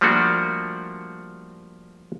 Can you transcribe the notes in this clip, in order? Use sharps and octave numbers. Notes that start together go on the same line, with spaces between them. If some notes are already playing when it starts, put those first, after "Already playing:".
F3 G3 A3 A#3 D4 F#4